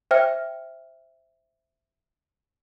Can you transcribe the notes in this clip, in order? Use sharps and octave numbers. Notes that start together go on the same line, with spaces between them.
C5 E5 G5 F6